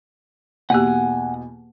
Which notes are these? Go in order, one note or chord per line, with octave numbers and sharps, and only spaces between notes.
E2 B2 A#3 G4 F#5 G#5 F#6